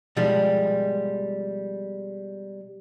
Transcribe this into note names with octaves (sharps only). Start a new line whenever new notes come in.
B2 F3 G3 G#3